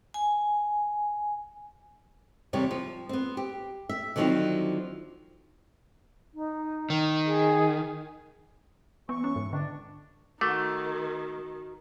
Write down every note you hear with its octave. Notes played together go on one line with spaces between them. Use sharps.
G#5
E2 C3 G3 C#5
F3
B3 C4
G4
E5
D3 D#3 F3 F#3 C4 E4
D#4
D#3
G#4
E3 B3 C#6
C#4
G#2
D3 D4
D#3 A3 F#4 D6